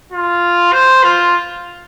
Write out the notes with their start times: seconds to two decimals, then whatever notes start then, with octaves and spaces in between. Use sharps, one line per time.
0.13 F4
0.73 C5
1.04 F4